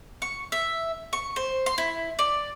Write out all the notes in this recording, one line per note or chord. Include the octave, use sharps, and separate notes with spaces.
C#6
E5
C#6
C5
C6
E4
D5